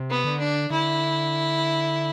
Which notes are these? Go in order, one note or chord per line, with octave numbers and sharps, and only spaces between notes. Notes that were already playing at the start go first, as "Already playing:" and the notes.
Already playing: C3
B3
D3
D4
D3 E4